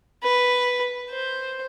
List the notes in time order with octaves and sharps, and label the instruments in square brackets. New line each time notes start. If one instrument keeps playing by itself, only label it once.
[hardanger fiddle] B4
C5